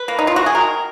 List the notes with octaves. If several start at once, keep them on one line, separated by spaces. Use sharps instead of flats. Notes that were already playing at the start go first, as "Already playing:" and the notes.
Already playing: B4
A#3
D#4
F4
A#3 F#4
G#4
D#3 A#4